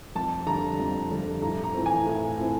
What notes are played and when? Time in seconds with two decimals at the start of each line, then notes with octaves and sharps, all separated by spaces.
0.15 F2 A5
0.46 D3 G3 A#5
0.80 F2
1.11 D3 G3
1.42 A2 A#5
1.64 A#5
1.74 E3 A3 C4
1.86 G#5
2.06 A2
2.39 E3 A3 C4